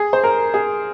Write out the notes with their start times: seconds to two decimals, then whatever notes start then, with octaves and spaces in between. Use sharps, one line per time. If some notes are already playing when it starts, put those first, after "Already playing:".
Already playing: G#4
0.13 C5
0.24 A#4
0.54 G#4